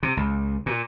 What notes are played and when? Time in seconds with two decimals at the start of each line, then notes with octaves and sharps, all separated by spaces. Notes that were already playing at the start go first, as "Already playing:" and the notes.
0.03 C3
0.17 C#2
0.66 A#2